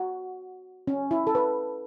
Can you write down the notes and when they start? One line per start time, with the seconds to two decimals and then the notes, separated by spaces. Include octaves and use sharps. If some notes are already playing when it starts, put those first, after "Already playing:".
Already playing: F#4
0.87 C#4
1.11 E4
1.27 A4
1.35 B4